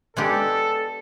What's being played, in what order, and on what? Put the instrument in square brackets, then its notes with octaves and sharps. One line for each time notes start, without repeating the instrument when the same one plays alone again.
[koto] G#3 B3 D4 G4 [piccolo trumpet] A4